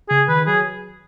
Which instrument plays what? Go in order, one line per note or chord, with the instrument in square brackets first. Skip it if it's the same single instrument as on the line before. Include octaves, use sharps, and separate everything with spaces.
[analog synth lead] C#3 [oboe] G#4
[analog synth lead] D#3 [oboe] B4
[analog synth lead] F#3 [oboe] G#4